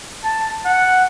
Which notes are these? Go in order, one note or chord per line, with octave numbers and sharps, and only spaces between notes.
A5
F#5